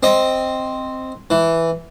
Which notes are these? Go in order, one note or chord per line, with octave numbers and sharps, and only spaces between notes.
C4 D#5
E3